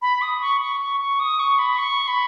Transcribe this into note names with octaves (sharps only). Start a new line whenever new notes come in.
B5
D#6
C#6
C#6
C#6
C#6
D#6
C#6
B5
C#6
B5